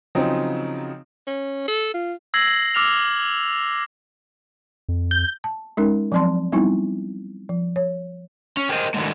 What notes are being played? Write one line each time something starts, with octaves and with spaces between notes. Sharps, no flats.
C#3 F3 F#3 C4 D#4
C#4
A4
F4
E6 G#6 A#6 C7 F#7
D6 E6 F6 A6 F7
F2
G6
A5
G#3 C#4 D#4 A#4
F3 F#3 C4 D5 A5 C6
G3 B3 C4 D#4 E4
F3
C#5
C#4
G4 G#4 A#4 C5 C#5 D#5
A2 D3 D#3 F#3 G#3 A#3